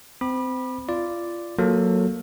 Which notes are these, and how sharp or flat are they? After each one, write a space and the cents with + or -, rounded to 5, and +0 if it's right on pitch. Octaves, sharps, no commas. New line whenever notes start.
C4 -30 B5 -15 D6 +40
F4 -25 D5 +0
F#3 -15 A#3 +0 A4 +0